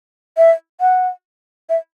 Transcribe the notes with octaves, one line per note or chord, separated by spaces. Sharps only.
E5
F#5
E5